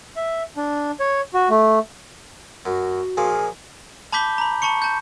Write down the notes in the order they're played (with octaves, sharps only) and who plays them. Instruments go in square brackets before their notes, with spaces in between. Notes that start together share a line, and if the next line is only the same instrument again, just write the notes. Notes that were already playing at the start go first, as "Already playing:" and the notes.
[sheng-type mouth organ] E5
D4
C#5
F#4
A3
[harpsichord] F#2 [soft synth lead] F#4
[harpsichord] A#2 F3 [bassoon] G#4
[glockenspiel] A5 B5 D6 G6 B6 G7
A#5 B5
A5 B5 C#6 C#7
A5 G6